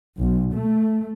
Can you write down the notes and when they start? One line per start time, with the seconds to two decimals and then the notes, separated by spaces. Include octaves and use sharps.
0.18 B1
0.53 A3